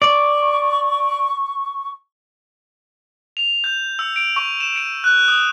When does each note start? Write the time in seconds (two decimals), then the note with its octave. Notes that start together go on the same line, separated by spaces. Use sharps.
0.02 D5 C#6
3.37 F7
3.64 G6
3.99 E6
4.16 D7
4.36 C#6
4.60 E7
4.76 D7
5.04 F#6
5.28 D#6